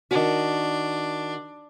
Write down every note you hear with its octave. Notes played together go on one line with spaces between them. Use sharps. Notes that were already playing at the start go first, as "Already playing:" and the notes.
D#3 D4 F#4